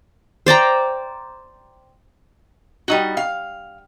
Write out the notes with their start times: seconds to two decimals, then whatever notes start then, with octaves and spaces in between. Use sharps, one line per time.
0.46 C5 D5 G5 A#5
2.88 G3 D#4 F#4
3.17 F5